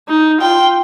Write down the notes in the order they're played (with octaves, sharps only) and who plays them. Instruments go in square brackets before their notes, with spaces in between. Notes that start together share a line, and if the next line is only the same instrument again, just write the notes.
[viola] D#4
[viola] F4 [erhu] G5